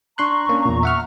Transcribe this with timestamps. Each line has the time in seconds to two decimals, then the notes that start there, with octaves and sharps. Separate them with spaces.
0.18 D4 A#5 C6 C#6 F#6
0.49 A#3 C#4 D4
0.66 E2 A#2
0.83 E5 F#5 F6